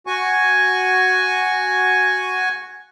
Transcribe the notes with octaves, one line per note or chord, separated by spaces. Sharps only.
F#4 G#5 C#6